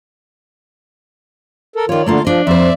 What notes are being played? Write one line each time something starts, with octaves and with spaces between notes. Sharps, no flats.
A4 A#4
D#3 F4 C#5 D5
D3 A3 A#3 F4
F3 D4 D#5
F2 C5 D5 E5